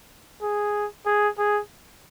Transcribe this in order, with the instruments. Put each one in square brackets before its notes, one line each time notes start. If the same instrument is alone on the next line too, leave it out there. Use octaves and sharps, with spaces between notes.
[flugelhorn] G#4
G#4
G#4